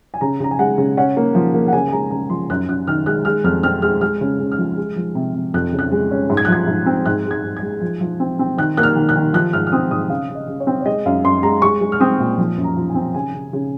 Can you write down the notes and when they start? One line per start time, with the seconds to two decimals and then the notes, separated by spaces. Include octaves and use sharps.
0.14 G#5
0.21 C#3 A#5
0.40 C#3 A#5
0.51 G#5
0.59 G#3 F#5
0.78 C#3
0.97 C#4 F#5
1.17 A#3
1.35 F3
1.54 A#3
1.68 F#5
1.73 C#3 G#5
1.88 G#5
1.92 G#3 A#5
2.11 C#3 A#5
2.30 F3 C6
2.50 F#2 F#6
2.69 F#2 F#6
2.87 D#3 F6
3.06 G#3 F#6
3.25 G#3 F6
3.44 F2 F6
3.63 C4 F6
3.82 G#3 F6
4.01 G#3 F6
4.21 C#3
4.40 C#3
4.52 F6
4.58 F3
4.77 G#3
4.96 F3
5.15 C3
5.34 C3
5.54 F2 F#6
5.73 C#3
5.79 F#6
5.91 G#3
6.11 C#4
6.30 G#2
6.37 G#6
6.45 F#6
6.48 F3 G#6
6.67 G#2
6.86 C4
7.06 G#2 F#6
7.25 G#3
7.31 G#6
7.44 G#2
7.57 G#6
7.62 G#3
7.81 F3
8.01 F3
8.20 C4
8.39 C4
8.57 D#3 F#6
8.77 A#3 F#6
8.83 F6
8.95 D#3
9.09 F#6
9.16 D#3
9.33 F3 F#6
9.53 G#2 F6
9.67 F6
9.72 C4 D#6
9.91 G#2 D#6
10.10 C#3 F5
10.30 C#3
10.35 D#5
10.48 C#3
10.60 C#5
10.67 C4
10.81 C#5
10.86 G#3 D#5
11.05 F#2 F5
11.24 F#2 C6
11.43 G#3 A#5
11.62 G#3 C#6
11.81 G#3
11.92 F6
12.00 C4 D#6
12.19 A#2
12.38 F3
12.57 F#2
12.64 A#5
12.76 F3
12.90 G#5
12.95 C4
13.14 C#3 G#5
13.34 C#3
13.53 C#3